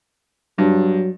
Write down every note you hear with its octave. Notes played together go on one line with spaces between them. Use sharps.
G2 F#3